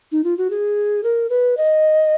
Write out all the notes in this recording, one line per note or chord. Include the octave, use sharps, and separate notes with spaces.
D#4
F4
F#4
G#4
A#4
B4
D#5